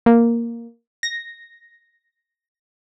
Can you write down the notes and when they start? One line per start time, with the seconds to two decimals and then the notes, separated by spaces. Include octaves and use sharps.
0.06 A#3
1.03 A#6